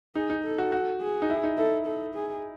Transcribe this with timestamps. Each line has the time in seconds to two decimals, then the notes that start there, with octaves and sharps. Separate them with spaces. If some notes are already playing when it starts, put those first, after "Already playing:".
0.15 D#4 G#4
0.30 D#4
0.44 A4
0.58 F#4
0.72 F#4
1.01 G#4
1.22 D#4
1.30 E4
1.43 D#4
1.58 E4 A4
1.86 A4
2.14 G#4